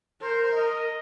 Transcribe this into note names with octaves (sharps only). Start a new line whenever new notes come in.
A#4 C5
D#5